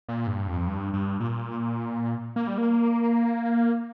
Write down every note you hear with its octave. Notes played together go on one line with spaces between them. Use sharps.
A#2
G2
F2
G2
G2
A#2
A#3
G3
A#3